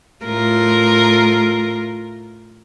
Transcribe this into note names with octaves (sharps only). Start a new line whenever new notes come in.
A2 F4 A#4